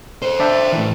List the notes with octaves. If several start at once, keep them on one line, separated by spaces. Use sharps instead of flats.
A4 C5
D4 E5 G5
A2 E3